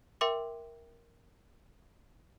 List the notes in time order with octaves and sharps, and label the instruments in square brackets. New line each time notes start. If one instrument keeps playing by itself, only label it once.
[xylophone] A#4 E5 G5 C6 D6